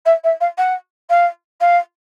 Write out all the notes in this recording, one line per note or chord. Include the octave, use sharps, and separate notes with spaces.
E5
E5
F5
F#5
F5
F5